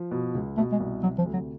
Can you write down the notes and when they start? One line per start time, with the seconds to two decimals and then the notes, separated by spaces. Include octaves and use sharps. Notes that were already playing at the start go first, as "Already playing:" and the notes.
Already playing: F3
0.11 B2
0.35 C#2
0.57 B2 A3
0.72 G#3
0.80 C2
1.03 C3 F#3
1.18 F3
1.26 D2
1.34 F#3